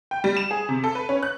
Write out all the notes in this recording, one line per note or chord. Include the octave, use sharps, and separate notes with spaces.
G5
G3
E7
G#4
C3
A4
B4
C#4
F#6